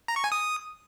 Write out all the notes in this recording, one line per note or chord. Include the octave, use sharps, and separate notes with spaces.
A#5
C#6
G#5
D#6